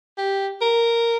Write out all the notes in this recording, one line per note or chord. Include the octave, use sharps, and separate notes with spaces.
G4
A#4